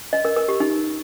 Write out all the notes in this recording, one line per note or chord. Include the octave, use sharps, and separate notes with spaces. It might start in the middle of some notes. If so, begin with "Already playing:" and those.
D#5
A#4
A#4
G4
D#4